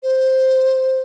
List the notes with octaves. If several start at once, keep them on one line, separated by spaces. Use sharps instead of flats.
C5